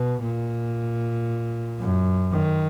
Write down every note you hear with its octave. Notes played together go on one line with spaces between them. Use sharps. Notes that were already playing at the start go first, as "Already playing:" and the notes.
Already playing: B2
A#2
F#2
D#3